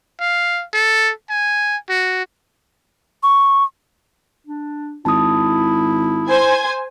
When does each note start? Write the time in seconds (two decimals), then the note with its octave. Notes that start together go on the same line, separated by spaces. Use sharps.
0.20 F5
0.73 A4
1.30 G#5
1.89 F#4
3.23 C#6
4.47 D4
5.05 G#1 E4 A5 D#6
6.28 C5 G#5 G#6